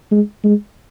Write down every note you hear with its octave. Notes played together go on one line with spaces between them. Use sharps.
G#3
G#3